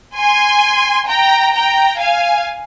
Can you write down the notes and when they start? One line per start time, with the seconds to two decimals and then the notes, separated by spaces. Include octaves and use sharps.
0.16 G#5 C6
1.07 G5 A#5
1.53 G5 A#5
1.99 F5 G#5